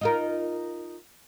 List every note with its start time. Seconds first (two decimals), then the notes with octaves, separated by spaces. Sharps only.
0.01 D#4 F4 A#4